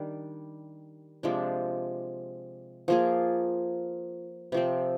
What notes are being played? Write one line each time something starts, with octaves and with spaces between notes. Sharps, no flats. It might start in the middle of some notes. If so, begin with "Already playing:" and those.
Already playing: D#3 G3 D4
C3 F3 G#3 D4
F3 A#3 F4 G#4
C3 F3 C4